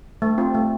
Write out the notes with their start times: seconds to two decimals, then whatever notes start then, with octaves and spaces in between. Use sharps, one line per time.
0.22 A3
0.38 C4 F4
0.55 A3